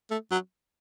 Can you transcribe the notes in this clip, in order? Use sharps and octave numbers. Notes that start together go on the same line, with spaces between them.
A3
F#3